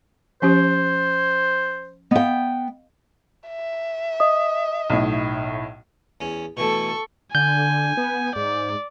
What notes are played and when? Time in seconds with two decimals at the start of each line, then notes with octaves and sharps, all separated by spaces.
0.42 F3 C#4 G4 C5
2.11 B3 D#5 F5 G5
3.48 E5
4.20 D#5 D#6
4.90 B1 A2
6.21 E2 C#4
6.57 B2 E3 A3 A4 C#6
7.35 D3 G#5 G6
7.97 B3
8.36 G#2 D5